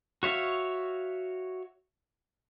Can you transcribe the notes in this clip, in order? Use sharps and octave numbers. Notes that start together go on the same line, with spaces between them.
F#4 C#5 E5 F5